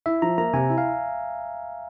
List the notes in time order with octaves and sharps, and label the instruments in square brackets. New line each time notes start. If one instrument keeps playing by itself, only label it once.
[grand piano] E4 [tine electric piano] E5
[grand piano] F3 [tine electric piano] A#5
[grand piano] A#3 [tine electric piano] A#5
[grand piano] C3 [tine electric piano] G#5
[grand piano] E4
[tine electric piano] F5